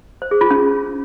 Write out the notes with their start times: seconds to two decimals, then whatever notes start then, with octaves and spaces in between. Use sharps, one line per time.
0.22 C5
0.31 G#4
0.41 F4
0.51 C#4